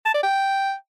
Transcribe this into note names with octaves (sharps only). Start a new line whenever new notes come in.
A5
D5
G5